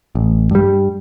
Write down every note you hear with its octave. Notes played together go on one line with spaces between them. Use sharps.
A1
G2 G3